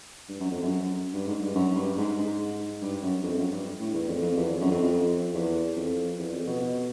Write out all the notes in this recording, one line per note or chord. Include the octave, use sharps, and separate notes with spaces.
G2
F#2
F2
F#2
G2
G#2
G2
F#2
F#2
G2
G#2
G#2
G2
F#2
F2
F#2
G2
A2
E2
F2
F2
E2
F2
F#2
F2
F2
E2
F2
E2
F2
B2
B2